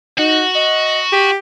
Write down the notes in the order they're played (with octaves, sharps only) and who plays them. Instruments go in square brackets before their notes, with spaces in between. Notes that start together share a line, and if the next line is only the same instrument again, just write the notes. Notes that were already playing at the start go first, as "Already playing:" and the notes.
[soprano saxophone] D#4 [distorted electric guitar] F#4
[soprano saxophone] D#5
G4